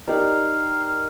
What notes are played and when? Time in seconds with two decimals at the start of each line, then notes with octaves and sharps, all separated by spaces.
0.08 D#4 G4 A#4 D5 F5
0.84 F5